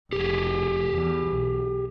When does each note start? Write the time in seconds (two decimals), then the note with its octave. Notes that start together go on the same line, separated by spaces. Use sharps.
0.13 F1 G4 G#4
0.91 E2 E3
1.26 B1